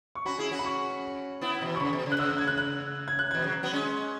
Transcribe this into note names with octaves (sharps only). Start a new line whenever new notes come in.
C#6
C#4 F#4 B5
E4 G#4
C#4 F#4
B5
C#6
B3 E4
B2 E3
C#6
C#3 B5
B2
C#3
F#6
C#3 E6
F#6
G#6
F#6
F#6
G#6
F#6
B2 E3 G#6
C#3 F#3
F#3 B3
G#3 C#4